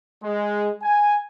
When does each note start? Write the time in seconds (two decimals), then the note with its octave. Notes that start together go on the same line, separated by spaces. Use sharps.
0.23 G#3
0.83 G#5